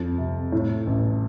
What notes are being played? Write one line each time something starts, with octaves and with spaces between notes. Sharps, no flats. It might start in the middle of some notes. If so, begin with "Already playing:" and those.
Already playing: F2
C3
A2
A1